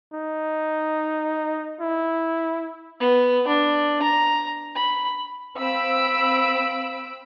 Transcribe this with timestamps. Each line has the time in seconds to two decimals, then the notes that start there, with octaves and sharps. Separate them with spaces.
0.13 D#4
1.81 E4
3.00 B3
3.47 D4
4.02 A#5
4.75 B5
5.57 C4 F5 B5 E6 D7